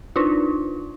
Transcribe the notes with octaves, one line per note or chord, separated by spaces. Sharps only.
D4 D#4 F4